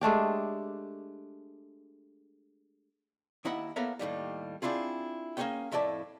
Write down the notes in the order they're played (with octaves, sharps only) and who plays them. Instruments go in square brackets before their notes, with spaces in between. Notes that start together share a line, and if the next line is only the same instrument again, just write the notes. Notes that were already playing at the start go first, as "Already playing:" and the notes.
[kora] G#3 A3 D4 G4
[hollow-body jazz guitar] D#2 D#4 E4 D#5 F#5 B5
A#3 B3 A4 A#4 C#5 E5
D#2 A2 F3 G3
C4 D4 E4 F4 G#4
A#3 C#4 F4 G#4 C#5 G5
F2 A2 E4 D5 A5